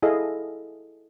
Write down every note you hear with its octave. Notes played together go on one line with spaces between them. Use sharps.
E4 G#4 A4 D#5 F5